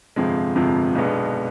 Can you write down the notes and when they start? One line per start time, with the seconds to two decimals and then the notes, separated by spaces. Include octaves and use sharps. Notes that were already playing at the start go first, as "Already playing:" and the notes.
0.16 G1 F2 C3 F3 G#3
0.55 G1 F2 C3 F3 G#3
0.95 B1 B2 G#3 B3 D4